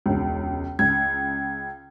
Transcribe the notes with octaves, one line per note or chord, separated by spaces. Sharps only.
E1 C#2
C#2 G#6